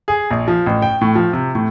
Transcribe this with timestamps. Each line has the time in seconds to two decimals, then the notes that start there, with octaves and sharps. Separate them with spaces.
0.08 G#4
0.31 A#1
0.48 F3
0.66 A1
0.82 G5
1.01 A2
1.15 F3
1.33 C3
1.55 A2